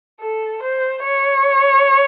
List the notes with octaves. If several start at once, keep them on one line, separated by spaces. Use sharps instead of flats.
A4
C5
C#5